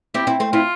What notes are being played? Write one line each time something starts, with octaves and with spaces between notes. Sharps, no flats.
C4 E4 G4
C4 E4
A3 C4
C4 E4 F4